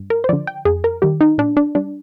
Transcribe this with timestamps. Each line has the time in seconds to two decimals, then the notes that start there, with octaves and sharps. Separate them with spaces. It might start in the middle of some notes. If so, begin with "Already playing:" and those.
Already playing: G2
0.10 A#4
0.24 C5
0.29 D3 F3 D5
0.47 G5
0.65 F2 G#4
0.84 A#4
1.02 D#3 G3 G4
1.21 D#4
1.38 A#2 D4
1.57 D4
1.75 G3 D4